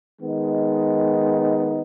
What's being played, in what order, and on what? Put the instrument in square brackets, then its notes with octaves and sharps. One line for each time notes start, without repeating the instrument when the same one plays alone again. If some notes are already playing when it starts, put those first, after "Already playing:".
[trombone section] D#3 G#3 B3 D#4